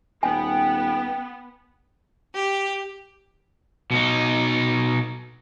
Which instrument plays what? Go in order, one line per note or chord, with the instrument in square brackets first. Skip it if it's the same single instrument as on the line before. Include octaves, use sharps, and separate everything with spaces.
[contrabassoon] D#1 [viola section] B3 [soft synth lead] G5 [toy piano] G#5
[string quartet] G4
[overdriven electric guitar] B2 D#4